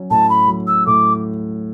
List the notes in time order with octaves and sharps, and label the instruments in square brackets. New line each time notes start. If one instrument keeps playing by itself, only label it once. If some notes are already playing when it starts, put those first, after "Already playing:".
Already playing: [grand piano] F#3 C#4
[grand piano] A2 [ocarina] A5
[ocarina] B5
[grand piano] F#3
[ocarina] E6
[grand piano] A2 [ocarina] D6